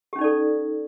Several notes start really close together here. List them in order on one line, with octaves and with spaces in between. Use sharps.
G4 C#4 D#4 D5 A4